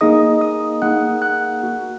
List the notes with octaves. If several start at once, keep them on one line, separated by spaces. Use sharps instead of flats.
A#3 D#4 G#4 D#5 D#6
D#5 D#6
A#3 D#4 G#4 F#5 F#6
F#5 F#6
A#3 F#4